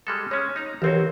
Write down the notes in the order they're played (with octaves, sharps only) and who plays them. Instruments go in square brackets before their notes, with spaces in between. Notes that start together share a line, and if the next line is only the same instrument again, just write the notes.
[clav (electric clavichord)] G3 G#3 A4
[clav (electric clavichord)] G#3 C#4 [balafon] C#5
[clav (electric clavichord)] D#4 A#5
[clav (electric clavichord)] B1 C4 F#4 [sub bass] E3 [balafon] G4 A#4 C#5